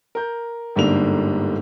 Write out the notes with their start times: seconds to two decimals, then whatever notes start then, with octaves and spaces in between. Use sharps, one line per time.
0.15 A#4 G6
0.76 G1 G#2 D3 G3 A#3 F7